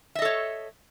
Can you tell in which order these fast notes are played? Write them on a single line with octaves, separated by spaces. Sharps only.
E5 D#5 A4 C#5